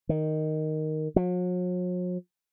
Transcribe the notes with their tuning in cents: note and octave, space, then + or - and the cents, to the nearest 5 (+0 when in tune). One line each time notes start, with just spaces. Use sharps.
D#3 -5
F#3 -45